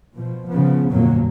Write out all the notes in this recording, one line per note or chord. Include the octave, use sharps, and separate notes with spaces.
B2 F3
C#3 F3 B3
G1 F2 A#2 F#3 A#3